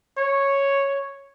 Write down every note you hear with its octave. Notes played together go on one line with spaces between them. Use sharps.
C#5